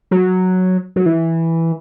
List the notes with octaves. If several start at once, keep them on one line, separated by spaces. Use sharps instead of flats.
F#3
F#3
E3